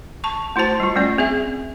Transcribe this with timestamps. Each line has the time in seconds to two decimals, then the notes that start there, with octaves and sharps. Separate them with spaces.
0.24 A5 C#6
0.56 A3 E4 F#4 C5 A5
0.80 G3 F4
0.96 G3 A3 C#4 D5
1.18 C4 G#4 E5